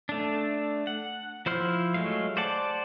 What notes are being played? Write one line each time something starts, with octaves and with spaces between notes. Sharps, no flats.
A3 D4
F#5
F3 E4 C5 C6 F6
F#3 G#3 A3 F5
C5 D5 F#5 A5